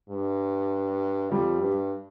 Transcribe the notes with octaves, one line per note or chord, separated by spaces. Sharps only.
G2
F2 G3
G2